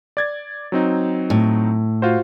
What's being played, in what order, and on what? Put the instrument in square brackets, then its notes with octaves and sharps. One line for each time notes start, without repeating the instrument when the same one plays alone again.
[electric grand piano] D5 G#6 A6
F#3 C4 D#4
[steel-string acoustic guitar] A2
[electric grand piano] F4 F#4 C5